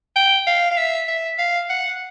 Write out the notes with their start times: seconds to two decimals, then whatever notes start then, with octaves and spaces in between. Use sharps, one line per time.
0.15 G5
0.47 F5
0.71 F5
0.77 E5
1.08 E5
1.38 F5
1.69 F#5